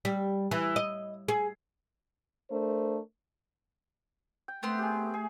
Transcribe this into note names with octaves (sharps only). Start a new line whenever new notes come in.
G3
E3
D#5
G#4
A3 D4 A#4 C5
G5
A3 B3 C4 C6
G4 G#4
G#4